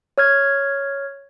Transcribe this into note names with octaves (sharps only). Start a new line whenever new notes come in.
C#5 F6 G#6